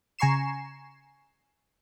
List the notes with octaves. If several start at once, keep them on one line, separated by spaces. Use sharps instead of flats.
C#3 G#5 A#5 C#6 C7 E7